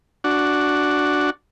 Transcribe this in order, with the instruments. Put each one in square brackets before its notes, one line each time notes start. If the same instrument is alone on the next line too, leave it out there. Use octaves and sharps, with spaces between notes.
[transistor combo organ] D4 F#4